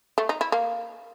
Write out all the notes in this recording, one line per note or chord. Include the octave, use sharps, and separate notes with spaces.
A3
D#4
E4
A#3